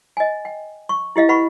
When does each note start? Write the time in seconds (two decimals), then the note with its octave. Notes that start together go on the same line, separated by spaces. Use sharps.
0.17 D#5 G#5
0.45 G5
0.89 C#6
1.16 E4 G4 D#5 F5
1.29 B4 F#5 B5 C#6